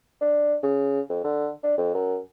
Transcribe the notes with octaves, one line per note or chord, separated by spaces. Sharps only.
D4
C#3
F2
D3
D4
F2
F#2